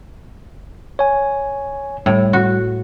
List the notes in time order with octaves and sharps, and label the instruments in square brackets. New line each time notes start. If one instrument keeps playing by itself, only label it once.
[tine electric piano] C#5 G#5
[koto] A2 [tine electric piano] G3
[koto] F#4